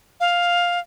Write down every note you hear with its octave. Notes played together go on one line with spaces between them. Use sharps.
F5